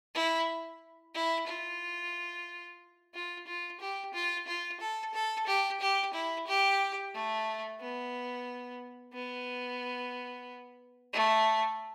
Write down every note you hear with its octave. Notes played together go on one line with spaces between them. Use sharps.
E4
E4
F4
F4
F4
G4
F4
F4
A4
A4
G4
G4
E4
G4
A3
B3
B3
A3